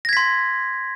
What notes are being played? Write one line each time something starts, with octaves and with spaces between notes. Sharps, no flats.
C6 G#6 A#6 B6